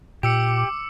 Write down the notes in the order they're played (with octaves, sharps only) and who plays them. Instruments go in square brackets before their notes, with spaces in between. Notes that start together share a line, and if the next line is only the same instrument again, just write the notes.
[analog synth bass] A#2 [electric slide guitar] G4 [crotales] D6 E6 C#7